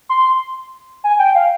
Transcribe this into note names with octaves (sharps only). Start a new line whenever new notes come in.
C6
G#5
G5
F5